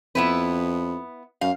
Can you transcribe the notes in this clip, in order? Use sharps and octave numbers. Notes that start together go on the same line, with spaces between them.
F2 B3 E4 B4
F#2 F5